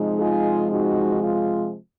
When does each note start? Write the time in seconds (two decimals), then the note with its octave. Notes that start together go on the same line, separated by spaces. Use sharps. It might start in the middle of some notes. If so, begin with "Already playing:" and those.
Already playing: C3 F3 G#3 D#4
0.20 F4 G#4
0.71 D#4 F#4
1.23 F4